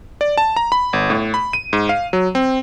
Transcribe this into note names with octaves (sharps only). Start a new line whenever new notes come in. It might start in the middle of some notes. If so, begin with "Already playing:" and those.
D5
A5
A#5
B5
G1
A2
B5
D#7
G#2
F5
F#3
C4